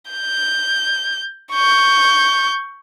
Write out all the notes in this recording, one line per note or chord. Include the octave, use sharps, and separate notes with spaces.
G6
C#6 G6